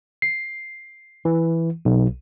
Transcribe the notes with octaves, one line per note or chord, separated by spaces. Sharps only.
C7
E3
B1